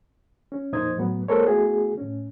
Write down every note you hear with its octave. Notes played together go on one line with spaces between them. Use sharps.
C#4
F2 A#2 D#4 C5 D#6 G#6
A2 F#3 B3
G#3 A#3 A4 A#4 C5 C#5
A3 B3 E4 F#4 G#4
A2 C#4